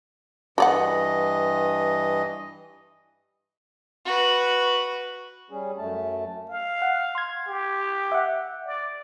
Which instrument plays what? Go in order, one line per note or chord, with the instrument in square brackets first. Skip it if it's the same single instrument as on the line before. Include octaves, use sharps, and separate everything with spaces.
[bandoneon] G2 E3 D#5 [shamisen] F#4 D5 F#5
[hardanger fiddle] F#4 B4
[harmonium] G3 C#4 G#4
F#2 A3 A5
[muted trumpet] F5
[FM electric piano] F#5
C6 G#6
[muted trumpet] G4
[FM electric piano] E5 F#5
[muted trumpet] D5